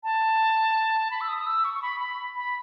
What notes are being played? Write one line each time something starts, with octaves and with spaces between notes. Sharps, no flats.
A5
B5
E6
D#6
D#6
E6
C#6
C#6
B5
B5
B5